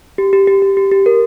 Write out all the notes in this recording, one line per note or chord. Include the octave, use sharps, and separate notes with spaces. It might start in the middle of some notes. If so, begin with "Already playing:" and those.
G4
G4
G4
G4
G4
G4
A#4